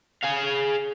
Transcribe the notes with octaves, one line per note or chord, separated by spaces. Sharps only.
G#4 F5